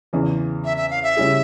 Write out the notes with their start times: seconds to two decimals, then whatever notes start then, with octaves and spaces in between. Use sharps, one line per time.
0.13 E2 C#3 E3
0.65 E5
0.77 E5
0.90 F5
1.03 E5
1.17 C#3 G3 C#4 E4 G#4